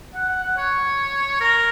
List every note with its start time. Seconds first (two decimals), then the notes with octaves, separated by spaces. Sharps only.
0.14 F#5
0.29 F#5
0.43 F#5
0.57 C#5
1.41 A#4